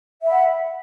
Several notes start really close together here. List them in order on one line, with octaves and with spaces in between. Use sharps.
E5 B5 F#5